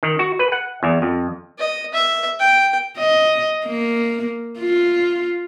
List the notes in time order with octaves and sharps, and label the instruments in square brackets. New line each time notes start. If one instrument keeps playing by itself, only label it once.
[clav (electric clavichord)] D#3
F#4
B4
F#5
E2
F2
[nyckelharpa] D#5
E5
G5
[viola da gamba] D#5
A#3
F4